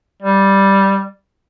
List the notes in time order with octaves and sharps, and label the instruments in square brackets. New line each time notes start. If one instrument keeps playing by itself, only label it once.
[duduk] G3